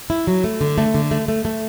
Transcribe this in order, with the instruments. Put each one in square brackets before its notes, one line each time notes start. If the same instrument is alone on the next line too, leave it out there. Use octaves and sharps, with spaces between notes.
[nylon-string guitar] E4
F#3
A3
D3
A3
D3
A3
A3
A3